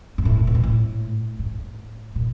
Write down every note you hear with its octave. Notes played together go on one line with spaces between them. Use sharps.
G#2
A2
B2
A#2
A2
A2
A#2